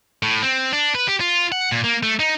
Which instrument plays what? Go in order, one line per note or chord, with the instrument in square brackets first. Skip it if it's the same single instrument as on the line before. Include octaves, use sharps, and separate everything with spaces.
[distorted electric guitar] A2
C4
D4
B4
G4
F4
F#5
A#2
A#3
A3
D#4